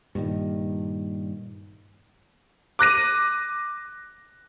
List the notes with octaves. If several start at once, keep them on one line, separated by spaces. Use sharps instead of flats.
G2 A#2 D#3
D6 F#6 A#6 D#7